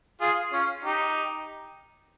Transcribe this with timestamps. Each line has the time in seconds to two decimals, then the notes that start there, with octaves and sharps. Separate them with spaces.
0.21 F4 G#4
0.53 C#4 F4
0.84 D#4 G4